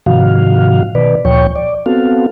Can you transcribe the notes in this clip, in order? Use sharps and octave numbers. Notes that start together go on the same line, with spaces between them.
G#2 C3 D#3 F3 F#4 F5
B2 D#3 B4 D5
D2 A#2 F3 C#5 G5 C#6
D5
B3 C4 F#4 A4 F5